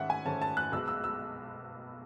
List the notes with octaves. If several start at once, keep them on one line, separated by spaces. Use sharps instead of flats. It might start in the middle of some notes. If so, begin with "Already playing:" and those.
Already playing: G#2 D#3 A3 C#4 E5 F#5
G#5
G#2 D#3 A3 C#4 A5
A5
F#6
B1 B2 G#3 B3 E6
E6
E6